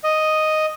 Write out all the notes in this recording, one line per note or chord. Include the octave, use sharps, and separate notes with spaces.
D#5